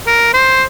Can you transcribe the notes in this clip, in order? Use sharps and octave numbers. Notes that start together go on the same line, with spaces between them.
A#4
C5